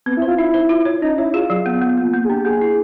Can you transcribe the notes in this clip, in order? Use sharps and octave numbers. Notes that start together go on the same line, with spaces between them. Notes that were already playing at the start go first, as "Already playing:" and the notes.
B3 C4
E4
C5
F4
D#4 E4
C5
F4
C#5
C#4 D#4
E4 C#5
F4 G#4
F#3
B3
B3
A#3
A#3
G#4
D4 G4
A#3 G#4
E4